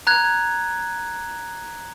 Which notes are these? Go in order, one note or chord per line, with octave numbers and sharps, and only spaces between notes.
A#5 F#6 G#6